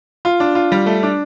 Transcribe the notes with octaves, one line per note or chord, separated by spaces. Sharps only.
F4
D4
F4
G3
A3
D4